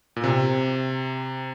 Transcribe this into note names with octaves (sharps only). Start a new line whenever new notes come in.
A#2
C3